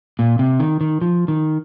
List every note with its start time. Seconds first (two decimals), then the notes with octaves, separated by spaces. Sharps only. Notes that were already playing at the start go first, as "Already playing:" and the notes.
0.19 A#2
0.39 C3
0.60 D#3
0.81 D#3
1.01 F3
1.28 D#3